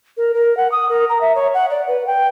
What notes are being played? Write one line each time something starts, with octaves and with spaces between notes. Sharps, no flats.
A#4
A#4
F#5
D#6
A#4
A#5
E5
C#5
F#5
D5
B4
G5